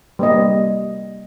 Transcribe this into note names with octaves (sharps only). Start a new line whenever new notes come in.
G3 A#3 D#5